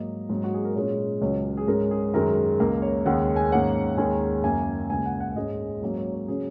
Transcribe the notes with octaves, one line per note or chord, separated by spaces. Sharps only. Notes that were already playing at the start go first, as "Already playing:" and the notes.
Already playing: G#2 F#3 A#3 D#5
G#2 F#3 A#3 C#4
F#4
G#4
A#4
A#2 G#3 C#4 C#5
C#2 C#3 F#3 C#4 C#5
G#4
G#2 G#3 C#4 A#4
G#4
F#2 D#3 G#3 C#4 A#4
C#2 C#3 A#3 A#4
C#5
D#2 C#3 G#3 C#4 F#5
G#5
G#2 D#3 A#3 C#4 F#5
D#2 D#3 G#3 C#4 G#5
F#2 C#3 A#3 G#5
C#2 C#3 A#3 G#5
F#5
F#5
G#2 G#3 C#4 D#5
G#2 F#3 A#3 C#4
C#5
C#5
C#3 F#3 C#4 G#4